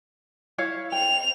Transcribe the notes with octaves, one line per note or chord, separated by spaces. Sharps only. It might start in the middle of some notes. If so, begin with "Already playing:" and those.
E4 C#5 F5
G5 F7